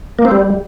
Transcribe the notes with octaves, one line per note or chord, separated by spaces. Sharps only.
A#3
C4
G3